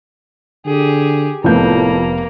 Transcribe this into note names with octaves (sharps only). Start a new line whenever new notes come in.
D3 G4 G#4
F1 F2 A2 A#3 B3 G6